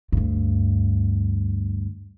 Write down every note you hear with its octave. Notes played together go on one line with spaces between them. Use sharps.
D2 G2